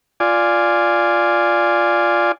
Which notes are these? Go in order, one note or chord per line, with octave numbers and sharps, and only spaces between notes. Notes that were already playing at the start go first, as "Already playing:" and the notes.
F4 D5 G#5